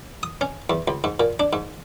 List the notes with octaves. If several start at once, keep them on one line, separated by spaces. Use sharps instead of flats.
D#6
C#4
E2
C#2
G#2
A#2
D4
G#2